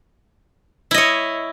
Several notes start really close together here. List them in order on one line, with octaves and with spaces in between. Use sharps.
E4 D#5 C#5